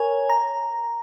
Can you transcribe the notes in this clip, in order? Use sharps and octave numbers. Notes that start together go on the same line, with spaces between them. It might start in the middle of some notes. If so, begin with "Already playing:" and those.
Already playing: A#4 C#5 G#5
A#5